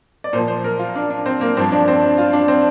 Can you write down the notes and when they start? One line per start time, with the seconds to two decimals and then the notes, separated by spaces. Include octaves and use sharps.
0.24 D5
0.33 A#2 C5
0.38 F3
0.48 C5
0.64 A#4
0.79 F4
0.95 D4
1.10 D4
1.26 C4
1.41 A#3
1.57 G2 F3 C4
1.72 D4
1.88 C4
2.02 D4
2.18 F4
2.33 D4
2.48 C4